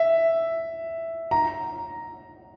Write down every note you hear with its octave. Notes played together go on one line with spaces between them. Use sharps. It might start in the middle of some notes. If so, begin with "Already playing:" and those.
Already playing: E5
A#5